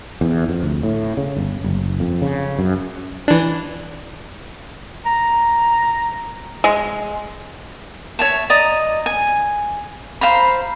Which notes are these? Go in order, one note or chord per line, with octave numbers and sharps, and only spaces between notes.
E2
F2
D2
A2
C#3
G1
F#1
F2
C#3
F#2
E3 D4
A#5
G#3
C#5 E5 A5
D5 D#5 A#5 D#6
G#5
C5 F5 A#5 B5